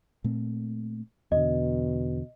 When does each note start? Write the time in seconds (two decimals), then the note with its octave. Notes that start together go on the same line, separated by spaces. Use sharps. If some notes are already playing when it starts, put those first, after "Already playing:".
0.24 A#2 A3 C4
1.32 E2 B2 D3 D#5